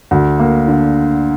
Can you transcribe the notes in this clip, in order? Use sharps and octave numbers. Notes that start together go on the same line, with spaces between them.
D2
A#3
D3